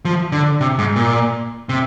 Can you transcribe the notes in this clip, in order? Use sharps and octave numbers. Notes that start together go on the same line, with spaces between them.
F3
D3
C3
G#2
A#2
C3